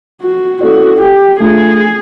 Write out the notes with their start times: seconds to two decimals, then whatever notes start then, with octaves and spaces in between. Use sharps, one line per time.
0.22 F#4
0.61 A#3 C#4 E4 F#4 A4 D5
1.00 G4
1.40 A3 D4 F4 G#4